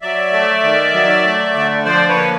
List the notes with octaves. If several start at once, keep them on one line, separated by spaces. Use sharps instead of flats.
F#3 D5 E5
A3
D#3
F#3
A3
D3
F3 C5 D5
B4 C#5
A#3